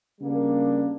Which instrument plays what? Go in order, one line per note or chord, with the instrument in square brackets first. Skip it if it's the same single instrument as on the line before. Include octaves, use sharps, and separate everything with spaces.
[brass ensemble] C#3 G3 A#3 D4